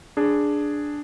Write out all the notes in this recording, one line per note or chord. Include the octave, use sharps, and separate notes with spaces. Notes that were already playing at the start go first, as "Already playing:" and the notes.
D4 G#4